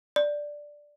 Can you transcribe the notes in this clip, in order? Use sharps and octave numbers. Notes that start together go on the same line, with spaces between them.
D5